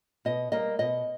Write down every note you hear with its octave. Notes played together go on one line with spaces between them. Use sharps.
B2 D#5
G3 A#3 D#5
B2 D#5